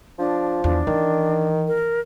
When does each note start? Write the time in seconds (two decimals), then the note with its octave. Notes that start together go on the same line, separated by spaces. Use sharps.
0.19 F3 D4
0.64 E2 D#3 D4
0.87 D#3 E3
1.68 A#4